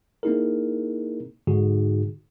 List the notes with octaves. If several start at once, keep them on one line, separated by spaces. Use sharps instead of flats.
A#3 C4 D#4 E4 G#4 A#4
G#2 D3 D#4 F#4 G#4